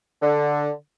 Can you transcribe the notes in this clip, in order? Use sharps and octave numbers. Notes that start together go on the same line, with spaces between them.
D3